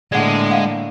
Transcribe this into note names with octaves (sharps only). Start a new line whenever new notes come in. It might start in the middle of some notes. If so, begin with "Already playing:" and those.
A2 D3 G#3 A#3 D5 F#5
F5 F#5